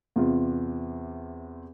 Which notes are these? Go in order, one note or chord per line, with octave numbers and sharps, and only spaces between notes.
E2 C3 F4